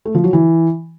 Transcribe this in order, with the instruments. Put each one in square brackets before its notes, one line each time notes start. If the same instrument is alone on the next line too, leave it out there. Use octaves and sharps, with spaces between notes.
[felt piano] A3
F3
F#3
E3